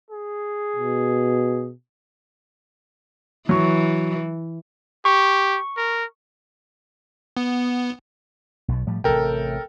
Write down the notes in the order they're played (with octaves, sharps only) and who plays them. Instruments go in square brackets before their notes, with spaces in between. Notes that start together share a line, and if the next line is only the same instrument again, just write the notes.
[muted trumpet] G#4
[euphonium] B2
[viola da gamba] E3 [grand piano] F#3 C#6
[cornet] G4 [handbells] C#6
[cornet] A#4
[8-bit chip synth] B3
[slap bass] B1 B2
A2 F3 G3
[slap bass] A1 C3 [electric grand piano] A4 A#4 G5